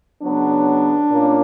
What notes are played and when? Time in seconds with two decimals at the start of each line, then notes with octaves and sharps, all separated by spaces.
0.23 C#3 F#3 B3 D4
1.11 A#2 A#3 C#4